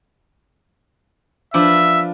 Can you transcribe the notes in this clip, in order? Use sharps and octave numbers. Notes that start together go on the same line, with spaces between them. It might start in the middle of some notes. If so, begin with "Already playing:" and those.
F3 D4 B4 E5